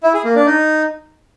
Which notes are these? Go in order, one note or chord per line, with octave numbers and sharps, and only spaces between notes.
E4
G#4
A#3
D4
D#4